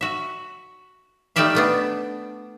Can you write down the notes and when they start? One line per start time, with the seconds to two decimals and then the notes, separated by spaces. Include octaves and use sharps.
0.01 F#4 E5
1.36 G3 A3 D#4 D5 E5 F5
1.55 A3 B3 D4